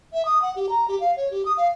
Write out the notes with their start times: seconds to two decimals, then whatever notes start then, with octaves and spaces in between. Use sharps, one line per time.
0.13 E5
0.25 D#6
0.42 F#5
0.56 G4
0.69 A#5
0.88 G4
1.00 F5
1.17 C#5
1.31 G4
1.45 D#6
1.57 F5